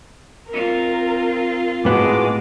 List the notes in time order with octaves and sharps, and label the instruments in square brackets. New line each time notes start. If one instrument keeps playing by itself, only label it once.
[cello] C4 F4 [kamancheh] A#4
[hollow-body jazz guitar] A2 B3 F#4 [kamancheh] G#3 D6